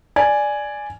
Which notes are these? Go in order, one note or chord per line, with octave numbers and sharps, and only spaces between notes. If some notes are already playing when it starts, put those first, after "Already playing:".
D5 G#5